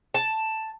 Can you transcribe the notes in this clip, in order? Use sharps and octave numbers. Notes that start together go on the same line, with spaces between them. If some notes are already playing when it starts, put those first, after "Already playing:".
A5